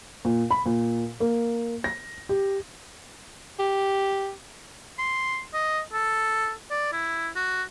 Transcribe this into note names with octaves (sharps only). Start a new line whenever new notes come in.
A#2
B5
A#2
A#3
A#6
G4
G4
C6
D#5
A4
D5
E4
F#4